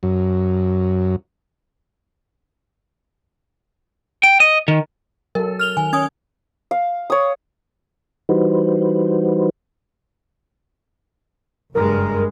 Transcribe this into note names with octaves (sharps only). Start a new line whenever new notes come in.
F#2
G5
D#5
D#3
F#3 A4 A#4
F6 F7 G7
D#3 G#5
C#4 G#5 D#6 G#6
F5
C#5 D#6
E3 G3 D#4 F#4 B4 C5
F#1 G2 G#3 A#4